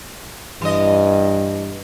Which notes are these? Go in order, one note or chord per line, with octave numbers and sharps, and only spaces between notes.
G2 E3 D#5